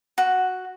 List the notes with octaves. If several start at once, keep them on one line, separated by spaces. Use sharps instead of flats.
F#4